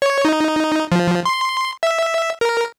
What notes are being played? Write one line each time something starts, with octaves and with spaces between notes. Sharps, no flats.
C#5
D#4
F3
C6
E5
A#4